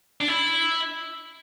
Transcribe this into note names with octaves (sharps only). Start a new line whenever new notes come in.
D4
E4